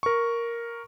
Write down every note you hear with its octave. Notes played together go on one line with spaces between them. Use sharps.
A#4 C#6